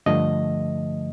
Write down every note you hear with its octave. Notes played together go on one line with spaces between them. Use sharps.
G2 D3 F3 A3 D#5